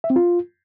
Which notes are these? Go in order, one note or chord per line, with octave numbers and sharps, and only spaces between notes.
E5
C4
F4